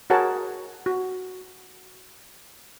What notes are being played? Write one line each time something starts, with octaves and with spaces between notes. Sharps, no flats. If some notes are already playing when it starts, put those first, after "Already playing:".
F#4 G#4 A#4 C#5 F#5 A5
F#4